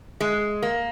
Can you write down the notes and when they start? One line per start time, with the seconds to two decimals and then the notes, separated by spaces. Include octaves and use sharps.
0.21 G#3
0.62 A#3